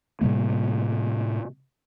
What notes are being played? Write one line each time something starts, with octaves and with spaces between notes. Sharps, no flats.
A2 C3 G3 A#3